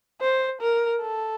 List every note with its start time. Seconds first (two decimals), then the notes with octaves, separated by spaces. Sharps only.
0.21 C5
0.61 A#4
1.02 A4